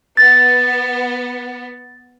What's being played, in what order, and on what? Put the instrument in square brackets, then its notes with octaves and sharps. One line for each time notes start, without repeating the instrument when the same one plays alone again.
[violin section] B3 [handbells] A6